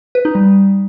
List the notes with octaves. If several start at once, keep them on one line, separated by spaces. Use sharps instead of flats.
B4
D#4
G3